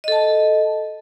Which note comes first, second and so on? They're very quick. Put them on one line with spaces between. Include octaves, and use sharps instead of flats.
D#5 A4 A5